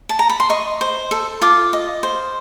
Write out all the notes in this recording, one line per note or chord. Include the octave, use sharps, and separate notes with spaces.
A5
A#5
B5
C6
D#5 C#6
C5
A4
F4 D6
D#5
C5